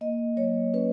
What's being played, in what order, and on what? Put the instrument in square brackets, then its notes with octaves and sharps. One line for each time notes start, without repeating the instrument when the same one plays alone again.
[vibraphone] A#3 D#5
F#3 C#5
C#4 B4